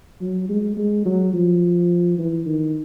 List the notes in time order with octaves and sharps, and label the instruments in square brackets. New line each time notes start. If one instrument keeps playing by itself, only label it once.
[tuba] F#3
G#3
G#3
F#3
F3
E3
D#3